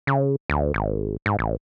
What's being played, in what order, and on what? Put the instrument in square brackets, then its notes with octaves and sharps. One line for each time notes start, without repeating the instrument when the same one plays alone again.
[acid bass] C#3
D2
G#1
G#2
A1